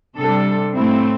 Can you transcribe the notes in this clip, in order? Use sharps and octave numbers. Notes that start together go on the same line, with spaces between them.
C3 G3 D4 A4
A2 A3 C4 E4